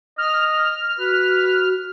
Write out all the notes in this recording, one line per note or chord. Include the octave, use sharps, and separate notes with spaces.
D#5 F6
F#4 B4